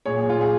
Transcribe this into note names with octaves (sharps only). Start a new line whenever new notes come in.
A#2 G#4 C#5
G#4
A#2 F4
G#4